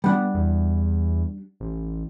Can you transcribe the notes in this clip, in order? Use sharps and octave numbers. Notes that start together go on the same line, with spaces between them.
G3 B3 D4 F#5
E2
A1